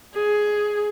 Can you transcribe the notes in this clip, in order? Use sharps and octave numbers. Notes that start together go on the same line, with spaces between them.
G#4